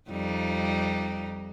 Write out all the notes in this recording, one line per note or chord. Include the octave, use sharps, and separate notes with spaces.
F2 G3 D#4